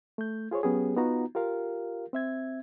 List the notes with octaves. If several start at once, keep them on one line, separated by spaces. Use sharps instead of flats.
A3 G6
F4 G#4 C5 C#5
F#3 B3 C#4 G4 G#4
B3 D#4 F4 F#4 A#5
F4 G4 A#4 F5
C4 E5 G#6